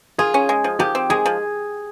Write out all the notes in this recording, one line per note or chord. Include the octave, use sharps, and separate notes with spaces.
F4 G#4
C#4
G#3
F3
F3 G4
C4
G#3 G#4
F3